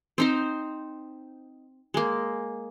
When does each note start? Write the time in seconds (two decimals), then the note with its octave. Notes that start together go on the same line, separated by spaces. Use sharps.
0.18 C4 D#4 C5
1.94 G#3 A#3